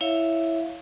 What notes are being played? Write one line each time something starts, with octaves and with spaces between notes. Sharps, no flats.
E4 C#5 E5 F5